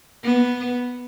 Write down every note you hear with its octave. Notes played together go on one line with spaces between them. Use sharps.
B3